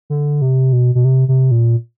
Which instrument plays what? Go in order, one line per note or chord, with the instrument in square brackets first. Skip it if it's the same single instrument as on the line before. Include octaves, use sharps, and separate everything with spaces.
[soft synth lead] D3
C3
B2
B2
C3
C3
A#2